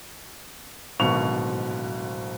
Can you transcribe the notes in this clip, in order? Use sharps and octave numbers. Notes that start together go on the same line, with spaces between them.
D1 G#1 B2 C#6 F7